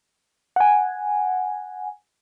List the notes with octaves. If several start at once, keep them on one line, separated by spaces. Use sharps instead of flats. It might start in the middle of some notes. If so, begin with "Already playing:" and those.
F#5 G#5